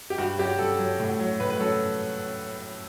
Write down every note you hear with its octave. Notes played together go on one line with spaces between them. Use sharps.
G4
G2 F#4
F#3 G4
G2 A4
F#3
A2
F#3
A2 B4
B4
F#3 A4